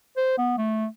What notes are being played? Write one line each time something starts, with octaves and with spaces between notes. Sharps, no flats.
C5
B3
A3